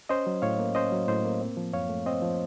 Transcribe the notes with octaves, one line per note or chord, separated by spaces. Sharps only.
C#4 C5 D#5
F#3
A2 C#5 F5
A#3
C#4 C5 D#5
F#3
A2 C5 D#5
A#3
C4
F3
F#2 C#5 F5
A3
C4 C5 D#5
F3